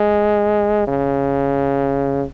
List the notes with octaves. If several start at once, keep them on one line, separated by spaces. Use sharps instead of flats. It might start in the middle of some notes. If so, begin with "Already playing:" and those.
Already playing: G#3
C#3